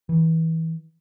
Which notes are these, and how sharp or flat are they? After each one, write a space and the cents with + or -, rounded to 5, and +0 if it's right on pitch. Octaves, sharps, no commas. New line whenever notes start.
E3 -25